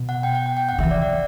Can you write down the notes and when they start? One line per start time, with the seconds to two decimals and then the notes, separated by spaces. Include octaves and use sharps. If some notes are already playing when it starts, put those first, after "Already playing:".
Already playing: B2
0.09 F#5
0.23 G5
0.35 F#5
0.46 G5
0.57 G5
0.69 F#5
0.79 D3 E5
0.83 E3
0.91 D5
1.02 F#5